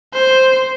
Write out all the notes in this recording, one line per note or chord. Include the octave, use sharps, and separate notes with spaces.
C5